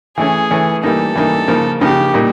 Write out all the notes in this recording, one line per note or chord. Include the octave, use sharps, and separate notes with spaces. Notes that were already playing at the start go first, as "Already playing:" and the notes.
E3 A3 C#4 G#4
E3 A3 C#4
E3 G3 A#3 D#4 A4
E3 G3 A#3 D#4
C#3 F3 A#3 D#4
C#3 F3 A#3 D#4 G4
A#2 G3 A#3 D#4